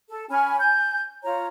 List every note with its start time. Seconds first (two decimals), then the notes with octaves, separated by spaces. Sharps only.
0.10 A4
0.30 C#4 G#5 B5 F6
0.59 G#5 G6
1.24 F4 C#5 A#5